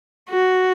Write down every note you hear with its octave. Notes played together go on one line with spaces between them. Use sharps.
F#4